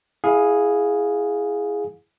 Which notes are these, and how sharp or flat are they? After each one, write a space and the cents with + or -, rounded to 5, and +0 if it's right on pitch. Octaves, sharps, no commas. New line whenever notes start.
E4 +0 G#4 +0 F5 +25